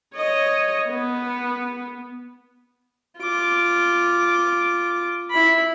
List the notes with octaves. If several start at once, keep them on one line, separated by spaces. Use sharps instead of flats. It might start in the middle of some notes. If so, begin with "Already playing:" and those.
C#5 D#5
B3
F4 D6
E4 B5